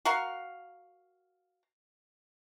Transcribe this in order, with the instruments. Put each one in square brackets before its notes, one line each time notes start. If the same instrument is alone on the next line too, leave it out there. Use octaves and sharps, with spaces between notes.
[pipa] F#4 A#4 F5